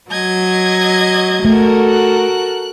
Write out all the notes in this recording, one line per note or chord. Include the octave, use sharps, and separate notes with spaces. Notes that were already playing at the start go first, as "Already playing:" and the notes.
F#3 D#5 G#6
A3 F#4 A4 A#4
F#6